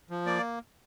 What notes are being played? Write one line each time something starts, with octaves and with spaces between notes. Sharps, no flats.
F3
A#3 D5